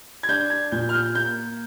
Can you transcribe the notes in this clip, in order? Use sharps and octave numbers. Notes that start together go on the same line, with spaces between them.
G#6
D4 G6
G#6
A#2 G6
F6
G6
A#3 G6